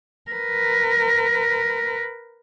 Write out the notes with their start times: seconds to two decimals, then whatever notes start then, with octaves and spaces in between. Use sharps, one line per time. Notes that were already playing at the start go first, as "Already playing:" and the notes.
0.31 A#4 B4